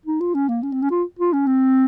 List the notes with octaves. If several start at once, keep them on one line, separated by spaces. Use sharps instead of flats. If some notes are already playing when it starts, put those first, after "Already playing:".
D#4
F4
C#4
A#3
C#4
C4
C#4
F4
F4
C#4
C4